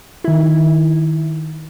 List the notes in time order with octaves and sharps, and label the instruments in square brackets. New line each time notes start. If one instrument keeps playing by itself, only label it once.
[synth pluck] D#3 E4